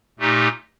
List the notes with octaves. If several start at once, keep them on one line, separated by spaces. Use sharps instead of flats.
A#2 A3 D#4 G4